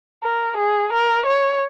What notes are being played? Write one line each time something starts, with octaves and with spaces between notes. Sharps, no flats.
A#4
G#4
A#4
C#5